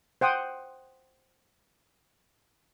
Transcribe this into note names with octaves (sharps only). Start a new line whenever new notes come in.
C5 F#5 G5 D#6